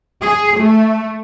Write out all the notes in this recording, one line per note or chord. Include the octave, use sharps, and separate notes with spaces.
G#4
A3